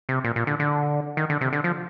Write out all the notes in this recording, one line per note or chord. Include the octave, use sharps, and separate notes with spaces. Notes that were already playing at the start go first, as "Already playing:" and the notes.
C3
A#2
A#2
D3
D3
D#3
D3
C3
D3
F3